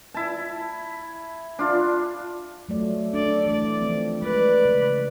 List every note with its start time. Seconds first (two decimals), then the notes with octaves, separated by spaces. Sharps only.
0.14 E4 A5
1.59 D4 F4
2.69 F#3 A3 D5
3.13 D4 A4 D5
3.46 E3 A3 D5
3.82 F3 C4
4.22 G#3 B4 D5
4.65 C#3